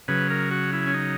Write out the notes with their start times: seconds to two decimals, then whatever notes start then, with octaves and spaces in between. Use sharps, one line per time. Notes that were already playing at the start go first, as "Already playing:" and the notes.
0.08 C#3 F#3 B4
0.30 A#4
0.51 F#4
0.73 E4
0.87 C#4
0.94 D#4